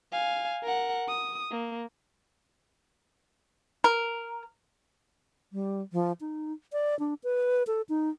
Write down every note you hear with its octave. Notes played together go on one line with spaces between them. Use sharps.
F5 G#5
A#4 F#5
D#6
A#3
A#4
G3
F3
D#4
D5
D4
B4
A4
D#4